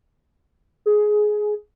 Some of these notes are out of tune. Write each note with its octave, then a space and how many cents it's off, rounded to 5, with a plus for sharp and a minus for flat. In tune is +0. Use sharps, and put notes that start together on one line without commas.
G#4 +15